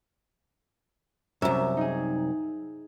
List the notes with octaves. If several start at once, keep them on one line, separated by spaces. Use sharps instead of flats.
C2 F#2 E5
D#4 G#4